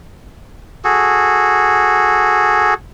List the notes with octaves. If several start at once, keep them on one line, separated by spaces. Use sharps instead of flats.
F#4 G#4 A4